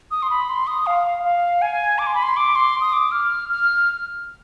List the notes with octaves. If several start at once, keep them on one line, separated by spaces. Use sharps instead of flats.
D#6
C6
B5
C6
D#6
F5
F5
G#5
D6
C6
B5
C6
D6
C6
D#6
D6
F6
F6